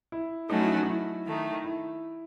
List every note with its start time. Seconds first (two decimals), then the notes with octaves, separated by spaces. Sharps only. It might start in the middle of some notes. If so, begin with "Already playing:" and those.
0.12 E4
0.49 F#3 A3 C#4 D#4 F#4
0.60 E4
0.69 D#4
0.83 D#4
0.88 E4
1.26 D#3 A3 D#4
1.64 E4